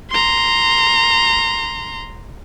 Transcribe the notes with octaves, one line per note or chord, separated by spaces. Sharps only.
A#5 C6